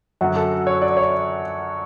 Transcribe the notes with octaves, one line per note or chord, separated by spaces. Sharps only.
F#2 D3 F#3 F#4
A4
C#5
D5
C#5